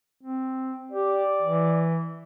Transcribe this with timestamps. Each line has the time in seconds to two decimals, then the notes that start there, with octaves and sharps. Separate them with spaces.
0.23 C4
0.92 G4 D5
1.43 E3